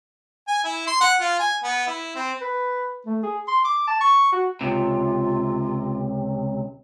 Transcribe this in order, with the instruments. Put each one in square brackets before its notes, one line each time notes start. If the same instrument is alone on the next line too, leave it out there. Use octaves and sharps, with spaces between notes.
[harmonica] G#5
E4
C6
F#5
F4
G#5
B3
E4
C4
[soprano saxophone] B4
A3
G#4
C6
D6
A5
C#6
F#4
[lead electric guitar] C#2 C3 [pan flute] F4